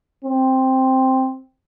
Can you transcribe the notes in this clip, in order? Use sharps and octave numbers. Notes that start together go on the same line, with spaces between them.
C4